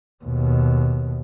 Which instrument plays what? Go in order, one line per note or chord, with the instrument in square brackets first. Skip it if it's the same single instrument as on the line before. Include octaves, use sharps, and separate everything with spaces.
[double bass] D#2 B2